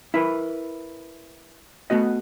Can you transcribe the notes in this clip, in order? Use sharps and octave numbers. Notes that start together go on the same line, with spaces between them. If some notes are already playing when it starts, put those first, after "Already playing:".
E4 A#4 B4
A3 B3 F#4 D#5